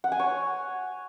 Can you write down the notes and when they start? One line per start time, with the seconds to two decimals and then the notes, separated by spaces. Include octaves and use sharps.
0.04 F#5
0.12 G#5
0.20 C#5